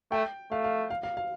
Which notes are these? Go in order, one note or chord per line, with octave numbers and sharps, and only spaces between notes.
A3 G5
A3 F5
F5
F5
F5
F5